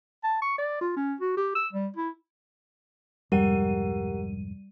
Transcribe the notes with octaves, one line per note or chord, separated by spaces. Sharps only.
A5
C#6
D5
F4
C#4
F#4
G4
E6
G3
E4
C2 F2 G#2 G3 G4 A#4 F#5 D#7